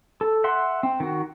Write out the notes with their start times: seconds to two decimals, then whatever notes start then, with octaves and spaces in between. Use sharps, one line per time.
0.21 A4
0.44 E5 F#5 C6
0.83 C4
1.00 D#3 F#4